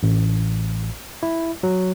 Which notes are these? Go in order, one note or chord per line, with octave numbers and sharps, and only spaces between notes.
A1
E4
F#3